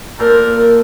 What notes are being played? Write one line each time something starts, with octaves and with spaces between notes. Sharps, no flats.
A#2 A4 A#4 C5